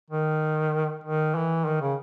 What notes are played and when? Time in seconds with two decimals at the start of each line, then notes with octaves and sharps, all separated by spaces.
0.10 D#3
1.04 D#3
1.35 E3
1.66 D#3
1.81 C#3